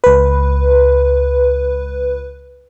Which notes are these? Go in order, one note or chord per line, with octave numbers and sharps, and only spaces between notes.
C#2 B4